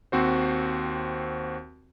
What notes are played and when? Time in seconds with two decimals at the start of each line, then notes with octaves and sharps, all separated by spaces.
0.12 D#2 C4 F#4 C5